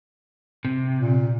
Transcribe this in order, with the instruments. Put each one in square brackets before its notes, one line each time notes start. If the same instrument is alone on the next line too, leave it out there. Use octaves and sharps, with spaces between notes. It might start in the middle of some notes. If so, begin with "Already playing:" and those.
[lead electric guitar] C3
[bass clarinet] A#2